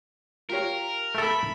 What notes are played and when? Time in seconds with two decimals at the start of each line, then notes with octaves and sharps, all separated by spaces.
0.50 F4 G4 A#4 C#5
1.15 A3 A4 E5 B5